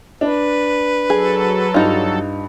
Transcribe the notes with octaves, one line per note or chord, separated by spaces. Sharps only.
D4 B4
F#3 G#4 A4
G2 D#4 F4